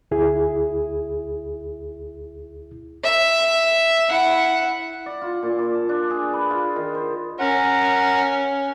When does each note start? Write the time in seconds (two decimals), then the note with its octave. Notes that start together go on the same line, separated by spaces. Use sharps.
0.11 D2 E4 G#4
3.04 E5
4.09 E4 F#5
5.06 D5
5.22 F4
5.43 A#2
5.59 D6
5.74 A5
5.89 D4
6.10 G#4
6.33 B4
6.50 F4
6.76 D#3
6.95 C5
7.39 C#4 A#4 F#5